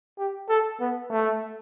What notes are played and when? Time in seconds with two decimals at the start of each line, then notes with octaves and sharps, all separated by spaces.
0.19 G4
0.49 A4
0.80 B3
1.11 A3